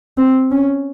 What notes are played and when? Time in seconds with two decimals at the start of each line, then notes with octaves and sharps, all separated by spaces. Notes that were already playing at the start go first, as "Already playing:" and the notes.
0.17 C4
0.51 C#4